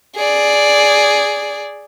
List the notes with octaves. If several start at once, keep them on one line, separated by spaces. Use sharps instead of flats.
G#4 D5